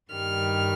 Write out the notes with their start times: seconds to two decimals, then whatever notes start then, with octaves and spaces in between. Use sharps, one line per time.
0.12 G2 D#3 G3 F6